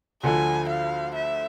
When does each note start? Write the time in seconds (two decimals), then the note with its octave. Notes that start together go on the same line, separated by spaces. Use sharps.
0.22 D2 D3 F3 G#5
0.69 F5
1.15 E5